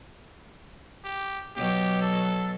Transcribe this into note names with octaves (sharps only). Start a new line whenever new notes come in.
G4
B2 F#3 G4
A4